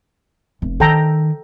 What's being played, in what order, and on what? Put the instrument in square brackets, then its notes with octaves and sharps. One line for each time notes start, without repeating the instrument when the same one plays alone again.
[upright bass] F1
[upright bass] D#3 [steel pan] A4 G5 A#5